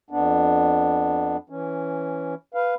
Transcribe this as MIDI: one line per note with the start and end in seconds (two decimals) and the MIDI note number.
0.11 1.37 41
0.11 1.37 59
0.11 1.37 62
1.50 2.35 52
1.50 2.35 61
2.54 2.75 71
2.54 2.75 77